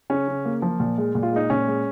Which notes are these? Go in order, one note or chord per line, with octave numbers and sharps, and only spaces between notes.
C#3 C#4
C#3
A#3
F3
A#2
G#3
A#2
F4
G#3 D#4
A#2 C#4
G#3